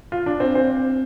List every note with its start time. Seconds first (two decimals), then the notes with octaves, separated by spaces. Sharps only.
0.12 F4
0.26 D4
0.40 C4
0.55 C4